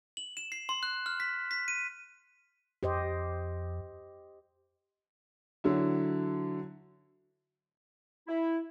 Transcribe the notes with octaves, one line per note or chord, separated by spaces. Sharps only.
F#7
E7
C7
C6
F#6
F6
B6
B6
D#7
F2 G4 C5 D#5
D3 F#3 E4
E4